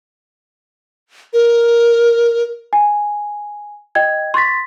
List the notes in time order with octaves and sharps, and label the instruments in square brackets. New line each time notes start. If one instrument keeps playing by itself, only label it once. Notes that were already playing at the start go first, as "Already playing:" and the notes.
[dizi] A#4
[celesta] G#5
D#5 G5 G#6
C6 C#6 A6 B6